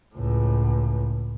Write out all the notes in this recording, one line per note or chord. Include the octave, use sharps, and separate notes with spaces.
C#2 A2